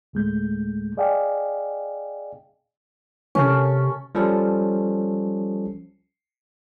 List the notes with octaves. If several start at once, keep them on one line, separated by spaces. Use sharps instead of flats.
D2 A2 G#3 A3 G6
G#4 D5 D#5 F5 G5 G#5
C3 C#4 A4
F3 G3 C#4 A4